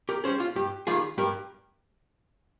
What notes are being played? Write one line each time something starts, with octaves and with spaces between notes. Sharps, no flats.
G4 A#4
G3 C#4 G#4 C5
F4
G2 G4
D#3 G3 F4 G#4
G2 G4 A#4